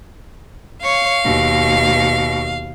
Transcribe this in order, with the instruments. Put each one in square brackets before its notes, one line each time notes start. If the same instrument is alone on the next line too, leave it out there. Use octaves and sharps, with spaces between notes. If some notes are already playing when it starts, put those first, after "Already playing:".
[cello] C#5 [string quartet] F5
[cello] D#2 B2